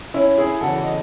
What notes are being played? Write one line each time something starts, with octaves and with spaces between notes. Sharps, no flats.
C#4 E4
E4 G#4
E2 C#3 E3 F#4 A4
D#5